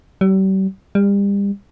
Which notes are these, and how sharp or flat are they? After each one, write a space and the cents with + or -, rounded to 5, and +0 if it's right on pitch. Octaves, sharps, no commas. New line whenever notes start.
G3 -40
G3 +35